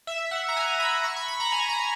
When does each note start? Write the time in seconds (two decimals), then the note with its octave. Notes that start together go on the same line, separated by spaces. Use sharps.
0.07 E5
0.31 F#5
0.48 A#5
0.57 G#5
0.80 B5
1.04 C#6
1.16 B5
1.28 B5
1.40 A#5
1.52 G#5
1.69 A#5